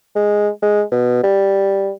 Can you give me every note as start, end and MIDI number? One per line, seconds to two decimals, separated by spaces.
0.16 0.49 56
0.63 0.82 56
0.92 1.18 47
1.23 1.91 55